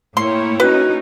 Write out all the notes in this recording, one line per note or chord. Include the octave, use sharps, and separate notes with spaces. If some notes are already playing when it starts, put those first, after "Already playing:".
A2 A#3 E4 C#5 G5 C6
C#4 D#4 F#4 B4